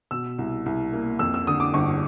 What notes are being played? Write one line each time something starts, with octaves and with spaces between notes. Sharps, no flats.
B2 E6
C2
C2
A#3
F2 E6
E6
D3 D#6
D6
G1 C#6